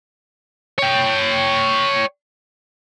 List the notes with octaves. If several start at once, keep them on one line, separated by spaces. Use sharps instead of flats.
C#5 G5